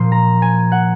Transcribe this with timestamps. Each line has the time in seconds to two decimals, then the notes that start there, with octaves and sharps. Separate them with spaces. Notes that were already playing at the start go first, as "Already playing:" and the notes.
Already playing: A#2 F3 A#3 C6
0.12 A#5
0.42 G#5
0.72 F#5